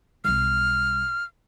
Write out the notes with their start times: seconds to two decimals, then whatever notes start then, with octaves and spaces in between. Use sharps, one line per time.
0.24 B1 G3 F6